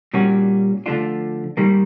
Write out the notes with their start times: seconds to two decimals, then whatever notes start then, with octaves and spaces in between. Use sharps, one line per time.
0.14 A#2 G3 A#3 C#4 F#4
0.86 D3 F3 A3 D4 F4
1.57 G#2 D#3 G3 A#3